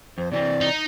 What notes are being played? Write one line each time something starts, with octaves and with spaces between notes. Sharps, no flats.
F2 C5
C3 E3 C4 D5
D#4